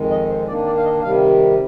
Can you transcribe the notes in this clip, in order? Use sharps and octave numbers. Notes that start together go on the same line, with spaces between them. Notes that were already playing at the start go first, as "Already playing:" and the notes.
Already playing: F2 D#3 G#3
D#5
C5
D#3 A#3 D4 D5
D5
F5
D#5
C3 D#3 G3 F5